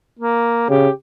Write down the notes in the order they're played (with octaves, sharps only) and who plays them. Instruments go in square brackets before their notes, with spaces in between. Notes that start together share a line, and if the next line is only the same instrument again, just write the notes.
[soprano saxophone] A#3
[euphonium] C#3 [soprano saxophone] G4